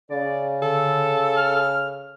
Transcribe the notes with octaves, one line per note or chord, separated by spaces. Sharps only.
C#3 D5
D3 A4
F6